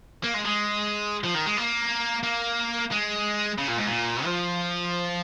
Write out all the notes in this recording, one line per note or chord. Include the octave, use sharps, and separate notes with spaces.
A#3
G#3
G#3
F3
D#3
G#3
A#3
A#3
G#3
C#3
A#2
G#2
A#2
F3